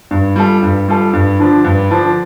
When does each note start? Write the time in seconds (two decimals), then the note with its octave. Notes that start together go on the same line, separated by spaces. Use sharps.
0.11 G2
0.36 G3 F4 A4
0.63 G2
0.88 G3 F4 A4
1.13 G2
1.39 D3 F3 D4
1.64 G2
1.91 D3 F3 D4